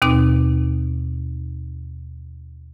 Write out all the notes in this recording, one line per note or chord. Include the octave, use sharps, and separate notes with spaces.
D#2 B2 C4 D#4 D6 D#6